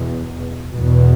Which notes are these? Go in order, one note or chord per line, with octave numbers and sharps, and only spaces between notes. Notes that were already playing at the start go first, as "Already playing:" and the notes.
Already playing: E2 B2
E2 B2